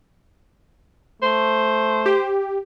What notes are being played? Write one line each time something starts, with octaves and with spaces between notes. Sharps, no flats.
A3 C5
G4